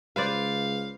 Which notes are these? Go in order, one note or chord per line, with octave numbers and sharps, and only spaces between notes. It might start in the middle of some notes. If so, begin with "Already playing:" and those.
C#2 B4 C5 D5 F5